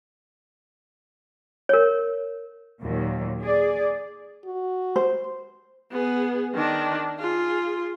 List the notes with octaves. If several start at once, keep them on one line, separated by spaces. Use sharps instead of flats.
A#4 C#5
D#2 A#2 F#3
G#4 D5
F#4
C5
B3 G#4
D#3 D4
F4 G#4